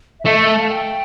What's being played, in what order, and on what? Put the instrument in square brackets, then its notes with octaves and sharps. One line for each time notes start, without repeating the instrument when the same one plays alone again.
[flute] E5
[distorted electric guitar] A3 [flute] D#5
[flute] E5
E5
F5
G5